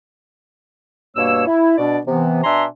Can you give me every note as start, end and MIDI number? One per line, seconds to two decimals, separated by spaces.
1.16 1.46 43
1.16 1.46 47
1.16 1.46 58
1.16 1.46 73
1.16 1.46 88
1.46 1.75 64
1.78 1.99 47
1.78 1.99 62
1.78 1.99 74
2.06 2.41 48
2.06 2.41 52
2.06 2.41 59
2.44 2.65 47
2.44 2.65 62
2.44 2.65 76
2.44 2.65 80
2.44 2.65 82
2.44 2.65 84